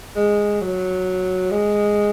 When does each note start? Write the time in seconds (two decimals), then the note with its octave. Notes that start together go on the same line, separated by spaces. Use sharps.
0.16 G#3
0.61 F#3
1.51 G#3